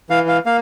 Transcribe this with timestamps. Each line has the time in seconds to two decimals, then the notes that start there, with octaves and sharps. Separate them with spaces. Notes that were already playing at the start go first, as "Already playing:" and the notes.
0.10 E3 F5
0.28 F5
0.46 A#3 F5